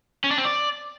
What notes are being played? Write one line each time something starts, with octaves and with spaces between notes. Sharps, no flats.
C#4
D4
C4
D5